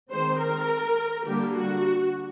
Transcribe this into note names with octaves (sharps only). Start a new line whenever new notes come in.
D#3 G#3 C4 C5
A#4
D3 G3 A#3 D4 G4
F#4